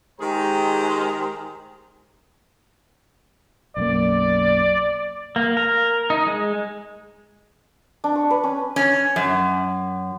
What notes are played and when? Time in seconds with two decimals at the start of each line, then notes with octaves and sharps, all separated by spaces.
0.20 D#3 G#3 G4 G#4 C5 A#5
3.77 B1 F#2 A#3 D5
5.36 A#3
5.57 A#4
6.10 D#4
6.27 G#3
8.04 D4
8.15 C#6
8.30 B4
8.44 C#4
8.76 C#4
9.16 F#2